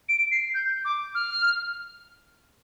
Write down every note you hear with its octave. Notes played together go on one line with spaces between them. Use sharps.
D7
C7
G6
D6
F6